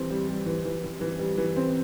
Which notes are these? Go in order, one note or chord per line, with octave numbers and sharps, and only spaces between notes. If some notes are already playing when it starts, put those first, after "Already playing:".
Already playing: E3 G3 C4
G3
G3
E3
E3
E3
E3
G3
E3
C4